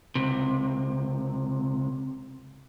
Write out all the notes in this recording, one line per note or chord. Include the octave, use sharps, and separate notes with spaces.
C#2 C3